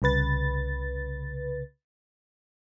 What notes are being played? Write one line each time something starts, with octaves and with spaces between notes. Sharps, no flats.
C2 C#3 B4 A6